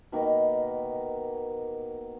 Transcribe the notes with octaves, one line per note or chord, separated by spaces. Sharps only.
B2 D#3 A#3